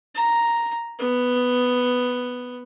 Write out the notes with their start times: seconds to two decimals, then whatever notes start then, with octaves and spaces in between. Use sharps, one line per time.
0.15 A#5
0.99 B3